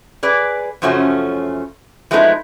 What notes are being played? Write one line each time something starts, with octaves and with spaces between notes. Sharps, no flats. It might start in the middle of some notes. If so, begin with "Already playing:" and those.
G#4 B4 D5
F#2 C#3 F3 A3 C#4 F#4
F3 G#3 A3 B3 D#4 E4